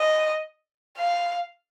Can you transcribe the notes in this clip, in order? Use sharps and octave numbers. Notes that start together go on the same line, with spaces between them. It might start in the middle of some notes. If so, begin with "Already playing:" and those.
Already playing: D#5
F5